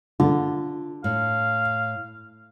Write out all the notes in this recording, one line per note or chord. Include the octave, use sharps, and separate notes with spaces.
D3 F4
A2 F5